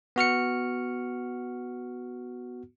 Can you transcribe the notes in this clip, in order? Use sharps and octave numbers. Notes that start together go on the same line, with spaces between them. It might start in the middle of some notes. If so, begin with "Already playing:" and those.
B3 F#4 F6 C#7